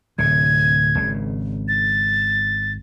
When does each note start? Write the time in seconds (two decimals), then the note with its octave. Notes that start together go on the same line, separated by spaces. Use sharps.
0.18 D1 C3 G#6
0.96 G#1 C#3
1.68 A6